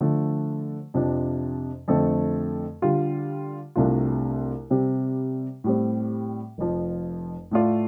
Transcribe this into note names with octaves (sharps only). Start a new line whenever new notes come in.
D3 F3 A3
F2 C3 F3 D4
F2 D3 A3 C4 A4
D3 G3 F4
C2 C3 A3 D4 F4
C3 G3 C4
A2 G3 C4
F1 F2 F3
A2 A3 F4 D5